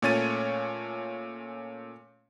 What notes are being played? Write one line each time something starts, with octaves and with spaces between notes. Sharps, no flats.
A#2 A3 C#4 C#5 A6 D#7